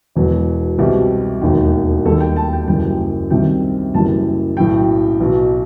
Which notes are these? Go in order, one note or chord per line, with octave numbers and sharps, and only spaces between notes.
E1 E2 B2 F#3
C2 B2 G3 G4
E1 D#2 D#3
D#2 D#3 G3 A4
G5
A5
G5
F#1 F#2 E3 G3 G5
C2 C3 D#3 F#3 G5
F#1 F#2 E3 G3 A5
B1 A2 F#3 G5
B1 B2 F#3